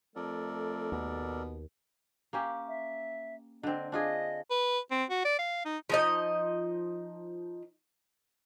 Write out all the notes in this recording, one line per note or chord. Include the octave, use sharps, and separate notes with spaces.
F2 A3 A4 A#4 D5
D#2 B2
A#3 C#4 G4
E5
D3 C4 D#5
D4 F4 G#4 D#5
B4
C4
F#4
D5
F5
D#4
F3 D#4 D#5